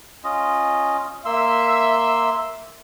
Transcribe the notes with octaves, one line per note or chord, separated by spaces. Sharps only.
C#4 F4 D#5
A#3 E5 C6 E6